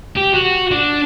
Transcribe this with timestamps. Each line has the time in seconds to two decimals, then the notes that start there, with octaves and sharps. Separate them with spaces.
0.16 G4
0.34 F#4
0.71 D4